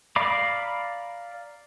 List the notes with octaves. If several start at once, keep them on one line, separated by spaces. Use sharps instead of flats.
D5 F5 A#5 B5 D6